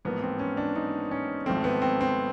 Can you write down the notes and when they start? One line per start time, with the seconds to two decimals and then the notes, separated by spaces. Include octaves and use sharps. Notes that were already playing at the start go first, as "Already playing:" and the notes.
0.05 A1 G#2 F3 A#3 B3
0.22 C4
0.39 C#4
0.57 D4
0.76 D#4
1.11 C#4
1.46 G#1 G#2 F3 A3 C4
1.64 B3
1.82 C4
2.01 C4